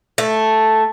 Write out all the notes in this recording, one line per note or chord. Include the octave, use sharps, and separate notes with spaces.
A3